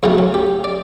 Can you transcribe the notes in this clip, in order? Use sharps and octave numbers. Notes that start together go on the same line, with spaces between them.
E2 C#3 F#3 A3 C#4
C#4
G4
D5